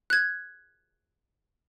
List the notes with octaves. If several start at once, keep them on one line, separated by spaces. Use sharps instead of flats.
F#6 G#6